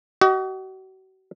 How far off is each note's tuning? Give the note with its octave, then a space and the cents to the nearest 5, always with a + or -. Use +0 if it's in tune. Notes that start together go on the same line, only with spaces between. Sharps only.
F#4 +40 D#5 +0